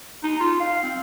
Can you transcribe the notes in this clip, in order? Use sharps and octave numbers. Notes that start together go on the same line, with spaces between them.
D#4
F4
F5
C4